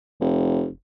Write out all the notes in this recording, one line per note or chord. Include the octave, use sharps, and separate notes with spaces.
F1